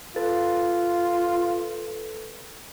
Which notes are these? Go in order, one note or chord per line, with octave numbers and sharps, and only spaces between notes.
F4 A4 B4 A6